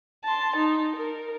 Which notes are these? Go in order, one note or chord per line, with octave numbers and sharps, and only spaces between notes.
A5 C6
D#4
A#4